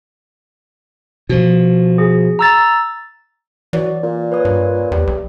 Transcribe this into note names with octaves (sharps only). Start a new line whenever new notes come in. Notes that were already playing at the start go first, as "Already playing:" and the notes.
B2 F3
G#4
A#5 E6 A6
E3 F#3 D5
A#2
B4 C#5 D#6
G2
E2 G3
B1